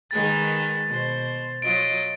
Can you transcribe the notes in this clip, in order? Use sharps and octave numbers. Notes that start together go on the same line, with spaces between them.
D#3 G#3 B4 A6
B2 C5
F#3 F4 D#5 D7